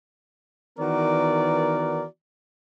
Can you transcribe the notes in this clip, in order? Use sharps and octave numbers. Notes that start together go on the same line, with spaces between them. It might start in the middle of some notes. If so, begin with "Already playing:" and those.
D#3 E3 B3 F#4 A#4 D5